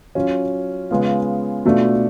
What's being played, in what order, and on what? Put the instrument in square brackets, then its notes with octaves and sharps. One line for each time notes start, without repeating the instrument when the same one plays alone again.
[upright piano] F#3 C#4 F4
C#3 G#3 B3 F4
B2 A3 D4 F4